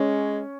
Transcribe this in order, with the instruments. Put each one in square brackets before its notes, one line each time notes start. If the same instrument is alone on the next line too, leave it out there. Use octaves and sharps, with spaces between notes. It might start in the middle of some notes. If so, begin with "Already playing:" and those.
Already playing: [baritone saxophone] G#3 [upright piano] C#4